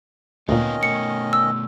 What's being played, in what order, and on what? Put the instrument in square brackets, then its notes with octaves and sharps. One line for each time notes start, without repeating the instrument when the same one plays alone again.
[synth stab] D2 A#2 [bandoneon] D#3 C#4 D#5 [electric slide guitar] B3 F4
[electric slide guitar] B2 A3 [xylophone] C#7
[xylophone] E6